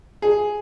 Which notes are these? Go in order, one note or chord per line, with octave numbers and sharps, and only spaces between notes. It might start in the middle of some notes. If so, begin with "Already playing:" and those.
G#4